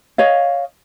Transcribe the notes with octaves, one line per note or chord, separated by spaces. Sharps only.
C#5 D#5 F5